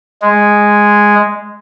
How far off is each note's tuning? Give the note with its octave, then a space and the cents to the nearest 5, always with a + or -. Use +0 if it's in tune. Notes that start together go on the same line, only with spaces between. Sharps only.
G#3 -5